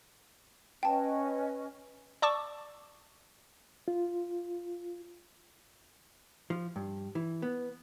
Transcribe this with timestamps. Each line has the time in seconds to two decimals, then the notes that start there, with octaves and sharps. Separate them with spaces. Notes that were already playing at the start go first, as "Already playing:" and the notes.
0.83 C#4 B4 D#5 G5 A5
2.22 D5 A5 C#6 D6 E6
3.88 F4
6.50 F3
6.76 G2
7.15 E3
7.42 B3